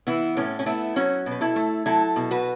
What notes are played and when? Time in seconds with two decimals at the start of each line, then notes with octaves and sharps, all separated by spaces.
0.07 E3 B3 E4
0.37 A2 A3 C#4
0.59 C#4
0.66 A3 B3 E4
0.96 F#3 C#4 F#4
1.26 B2
1.31 B4
1.41 E4 A4
1.56 A3
1.86 F#3 E4 A4
2.16 B2
2.31 F#4 B4